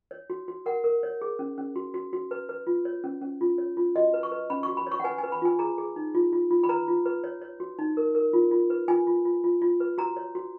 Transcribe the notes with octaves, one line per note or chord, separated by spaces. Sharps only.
C#5
F#4
F#4
A#4 F#5
A#4
C#5
G#4
C#4
C#4
F#4
F#4
F#4
B4
B4
F4
C#5
C#4
C#4
F4
C#5
F4
F#4 D#5
B4
C#6
B4
C#4 B5
F#4 C#6
B5
C#5 C#6
F#5
B4 G#5
G#5
B4
B5
F4 G#5
G#4 A#5
G#4
D#4
F4
F4
F4
B5
B4 A#5
F4
B4
C#5
C#5
F#4
D#4
A#4
A#4
F4
F4
B4
F4 G#5
F4
F4
F4
F4
B4
F#4 A#5
C#5
F#4